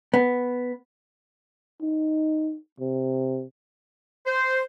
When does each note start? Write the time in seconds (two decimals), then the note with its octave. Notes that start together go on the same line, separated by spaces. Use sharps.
0.14 B3
1.82 D#4
2.80 C3
4.27 C5